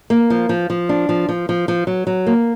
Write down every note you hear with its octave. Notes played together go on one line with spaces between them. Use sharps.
A#3
F3
F3
F3
D4
F3
F3
F3
F3
F#3
F#3
A#3